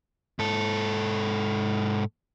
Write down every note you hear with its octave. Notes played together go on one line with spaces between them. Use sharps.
G#2 A4